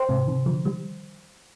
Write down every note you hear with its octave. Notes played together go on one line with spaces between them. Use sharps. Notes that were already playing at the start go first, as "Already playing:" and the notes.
Already playing: C5 G5 C6
G#2 C3
C3 D#3
D3 F3
D#3 G3